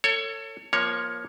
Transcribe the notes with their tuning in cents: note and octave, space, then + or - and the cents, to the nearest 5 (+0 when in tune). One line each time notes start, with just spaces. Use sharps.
A4 +30 C#5 +0
F3 +0 A#3 +20 C#5 +0